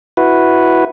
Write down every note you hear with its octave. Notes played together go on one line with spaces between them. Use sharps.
E4 F#4 B4